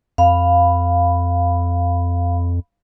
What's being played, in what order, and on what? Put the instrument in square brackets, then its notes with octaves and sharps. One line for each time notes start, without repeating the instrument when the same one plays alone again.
[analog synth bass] F2 [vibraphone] F5 B5